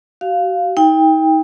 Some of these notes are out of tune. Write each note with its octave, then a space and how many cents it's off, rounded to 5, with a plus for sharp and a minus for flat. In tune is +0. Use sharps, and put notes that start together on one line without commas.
F#4 +35 F5 +0
D#4 +35 G5 +25